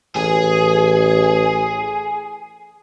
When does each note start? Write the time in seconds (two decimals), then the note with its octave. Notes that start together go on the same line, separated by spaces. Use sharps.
0.16 A1 G#4